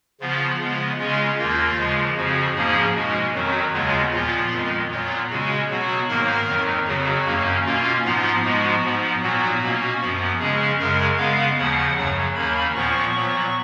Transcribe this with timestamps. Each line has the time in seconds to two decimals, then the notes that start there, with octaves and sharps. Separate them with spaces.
0.21 C#3 F3 B3 F4
0.60 C#3 G#3 B3 F4
0.99 C#3 G#3 C#4 F4
1.39 D#2 D#3 A#3 F4
1.78 C#3 F3 G#3
2.17 F2 C#3 F3 F#4
2.56 G#2 F3 A#3 C#4 G#4
2.95 B2 G#3 C#4 F#4
3.35 F2 D#3 F#3 F#4
3.74 D#2 C#3 G#3 B3 F4
4.13 A#2 F3 B3 F4
4.52 F2 D#3 G#3
4.91 A#2 F#3 B3 F4
5.30 C#3 G#3 C#4 F#4
5.69 B2 F#3 B3 F#4
6.09 G#2 D#3 A#3 A#4
6.48 F2 D#3 F#3
6.87 F2 C#3 F#3 F#4
7.26 F#2 D#3 A#3 C#4
7.65 B2 A#3 C#4 F4
8.05 G#2 F3 B3 F4
8.44 G#2 F3 G#3 B3 F#4
8.83 G#2 F3 B3
9.22 A#2 F#3 B3 F#4
9.62 B2 A#3 C#4
10.01 F#2 F3 B3
10.40 C#3 G#3 C#4 G#4
10.79 F#2 C#3 G#3 A#4
11.18 C#3 G#3 B3 F5
11.58 D#2 C#3 F3 F#5
11.97 F#2 C#3 F#3
12.35 D#2 D#3 A#3 C#4 B5
12.75 A#2 F3 B3 C#6
13.14 A#2 F#3 B3